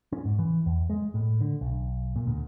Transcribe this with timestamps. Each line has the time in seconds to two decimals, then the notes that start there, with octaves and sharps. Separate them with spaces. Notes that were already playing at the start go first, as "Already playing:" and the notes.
0.12 C#4
0.25 G#2
0.39 E3
0.66 E2
0.90 G#3
1.14 A2
1.41 D3
1.61 B1
2.16 A#2
2.27 D2